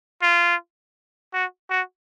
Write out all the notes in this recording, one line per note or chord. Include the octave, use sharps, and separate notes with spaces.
F4
F#4
F#4